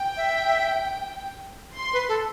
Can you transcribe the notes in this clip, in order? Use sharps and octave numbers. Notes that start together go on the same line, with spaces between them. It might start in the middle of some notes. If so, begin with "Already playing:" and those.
Already playing: G5
E5
C6
B4
A4